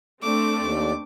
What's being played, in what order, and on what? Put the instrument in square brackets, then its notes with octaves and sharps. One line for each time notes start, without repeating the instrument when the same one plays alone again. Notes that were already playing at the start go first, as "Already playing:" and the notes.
[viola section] A3 C4 D4 [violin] D6
[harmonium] D#2 D5